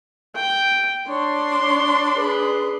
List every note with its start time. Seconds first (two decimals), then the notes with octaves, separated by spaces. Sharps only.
0.35 G5
1.08 D4 C#5 C6
1.61 C#5
2.14 G#4 B4